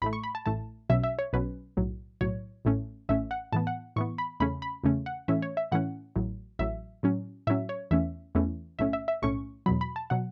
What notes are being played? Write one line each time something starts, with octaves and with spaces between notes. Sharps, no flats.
A1 A2 A3 B5
C#6
B5
A5
A1 A2 A3 A5
B1 B2 F#3 C#4 E5
E5
C#5
B1 B2 F#3 C#4 B4
B1 A2 F#3
B1 A2 F#3 C#5
A1 A2 A3 C#4
A1 A2 A3 C#4 E5
F#5
A2 E3 B3 A5
F#5
A2 E3 B3 C#6
B5
E2 C#3 A3 C#4 B5
B5
E2 C#3 A3 C#4
F#5
A2 E3 A3 C#4 E5
C#5
E5
A2 E3 A3 C#4 F#5
A1 A2 F#3
A1 A2 F#3 E5
A2 F#3 C#4
A2 F#3 C#4 E5
C#5
E2 E3 A3 C#4 E5
E2 E3 A3 C#4
B1 A2 A3 C#4 E5
E5
E5
B1 A2 A3 C#4 C#6
E2 B2 F#3 B5
B5
A5
B2 F#3 F#5